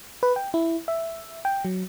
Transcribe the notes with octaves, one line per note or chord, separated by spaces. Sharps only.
B4
G5
E4
E5
G5
F#3